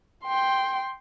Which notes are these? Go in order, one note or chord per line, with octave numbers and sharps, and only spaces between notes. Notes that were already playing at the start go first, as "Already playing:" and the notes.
G5 C6